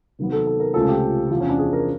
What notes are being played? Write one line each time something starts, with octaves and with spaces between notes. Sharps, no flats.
C3 D#3 F#3 B3
A4
A4
A#4
C#2 C3 F3 A3 C#4 A4
G4
E2 C3 F3
C#4
D4
G#4
A#4